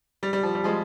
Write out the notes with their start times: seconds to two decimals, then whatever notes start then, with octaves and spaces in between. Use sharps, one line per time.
0.23 G3
0.33 G3
0.43 F3
0.55 G3
0.64 F3 G#3